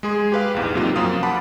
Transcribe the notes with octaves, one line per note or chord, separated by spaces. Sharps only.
G#3 G#4 C6
G4 B4 F5
A#1 E2 G#2
C3 F#3 A#3 D#4 F4 G4
F#2 F3 A#3 F4 F5 D#6
F#5 A5 B5 D6